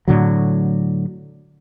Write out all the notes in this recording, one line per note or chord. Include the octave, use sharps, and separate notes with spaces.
A2 D3 F#3